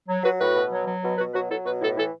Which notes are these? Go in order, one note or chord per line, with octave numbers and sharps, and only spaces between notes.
F#3
F#3 F#4 B4
A2 F#4 B4
B2
F#3
F#3
B2
B2 F#4 B4
F#3 F#4 B4
F#3 E4 A4
B2 F#4 B4
A2 E4 A4
E3 E4 A4